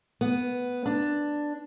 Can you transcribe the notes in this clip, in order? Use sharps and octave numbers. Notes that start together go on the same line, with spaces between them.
B3
D4